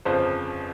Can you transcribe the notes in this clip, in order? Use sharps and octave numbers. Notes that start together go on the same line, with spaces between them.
G1 F2 C#3 F3 C5